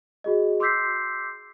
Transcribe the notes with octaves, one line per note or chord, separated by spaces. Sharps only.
F#4 G#4 D#5
C6 D6 E6 G6 B6 C7